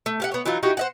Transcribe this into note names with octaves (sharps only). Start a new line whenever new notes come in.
A3
G4 F5 F#5
B3 C#5
E3 F#3 D#4 F4
D#4 E4 F#4 G4
C5 D#5 F#5